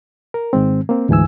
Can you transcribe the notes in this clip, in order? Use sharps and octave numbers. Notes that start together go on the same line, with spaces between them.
A#4
G#2 D#3 G#3 C4
A#3 C4
D2 G#2 E3 G#5 E6